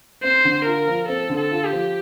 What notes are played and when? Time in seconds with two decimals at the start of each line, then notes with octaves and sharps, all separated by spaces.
0.23 C4 C5
0.45 D3
0.66 F4 A#4
0.87 F3
1.08 C4 A4
1.30 D3
1.37 A4
1.52 F4
1.66 G4
1.73 F3